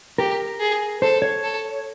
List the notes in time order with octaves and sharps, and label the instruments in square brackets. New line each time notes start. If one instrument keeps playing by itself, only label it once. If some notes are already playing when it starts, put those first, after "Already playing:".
[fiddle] G4 [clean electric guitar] A#4
[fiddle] G#4
[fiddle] A4 [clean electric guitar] C5
[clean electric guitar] C#5
[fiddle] A4